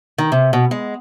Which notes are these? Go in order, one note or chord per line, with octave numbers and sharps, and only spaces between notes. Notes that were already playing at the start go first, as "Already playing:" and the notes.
D#3
C3
B2
G#3